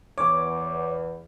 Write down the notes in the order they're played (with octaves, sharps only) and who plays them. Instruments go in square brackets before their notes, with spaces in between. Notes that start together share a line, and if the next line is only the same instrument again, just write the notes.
[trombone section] E2 [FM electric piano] C#5 [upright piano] D6